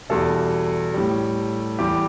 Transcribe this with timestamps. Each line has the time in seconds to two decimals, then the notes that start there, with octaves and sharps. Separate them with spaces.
0.09 E2 B2 G3 A4
0.94 A2 G3
1.79 E2 E3 G3 G4